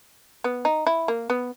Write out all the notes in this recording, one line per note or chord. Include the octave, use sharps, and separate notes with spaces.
B3
D#4
E4
A#3
B3